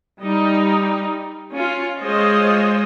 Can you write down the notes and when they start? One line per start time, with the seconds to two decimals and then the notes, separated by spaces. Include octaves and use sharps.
0.22 G3 D#4
1.53 C#4 F4
2.01 G#3 F4 C5 C#5 D#5